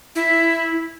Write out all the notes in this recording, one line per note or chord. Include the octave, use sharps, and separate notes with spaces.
E4